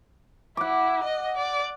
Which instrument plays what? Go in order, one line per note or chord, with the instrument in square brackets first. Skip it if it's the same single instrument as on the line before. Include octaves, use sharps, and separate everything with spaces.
[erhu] E4 [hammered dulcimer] F#5 D6
[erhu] D#5
D5